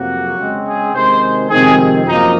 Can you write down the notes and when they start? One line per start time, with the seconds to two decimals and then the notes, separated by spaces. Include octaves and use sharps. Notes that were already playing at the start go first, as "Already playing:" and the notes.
Already playing: F2 C3 F#3 A#3 F#4
0.38 C#3 G#3 C4
0.64 G#4
0.93 C3 D#3 G#3 C5
1.49 F2 C3 D#3 G#3 C4 G#4
2.05 F#2 F3 A#3 D#4